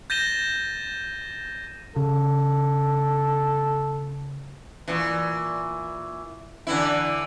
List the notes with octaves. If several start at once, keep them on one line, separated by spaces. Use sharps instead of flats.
G6 A6 A#6 D#7 E7 G7
C#3 A4
A#2 E3
D3 E3 E4